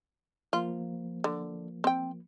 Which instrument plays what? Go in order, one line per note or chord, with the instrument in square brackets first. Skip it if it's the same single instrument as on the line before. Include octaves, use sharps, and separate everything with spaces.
[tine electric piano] F3 A#3 [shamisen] F4
[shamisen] D3
C4 G5